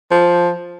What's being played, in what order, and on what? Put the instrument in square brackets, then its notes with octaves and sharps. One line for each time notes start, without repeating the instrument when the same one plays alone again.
[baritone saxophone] F3